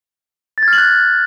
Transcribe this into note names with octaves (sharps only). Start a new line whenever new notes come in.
A6
G#6
F6
F#7
F#6